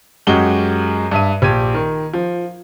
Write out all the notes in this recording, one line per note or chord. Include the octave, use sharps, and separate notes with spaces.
F#2 G#3 F#4 G4 G7
G2 E5 D#7
A#1 G4 G#6 D#7
D#3
F3